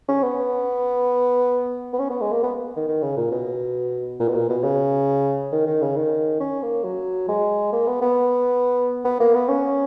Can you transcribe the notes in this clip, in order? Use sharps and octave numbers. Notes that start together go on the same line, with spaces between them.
C#4
B3
B3
C#4
B3
G#3
A#3
B3
D#3
D#3
C#3
A#2
B2
A#2
B2
A#2
B2
C#3
D#3
D#3
C#3
D#3
C#4
A#3
F#3
G#3
A#3
B3
B3
B3
A#3
B3
C#4